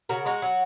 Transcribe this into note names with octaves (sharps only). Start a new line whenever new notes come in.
C#3 F#4 A#4
G#3 F#4 A#4
F#3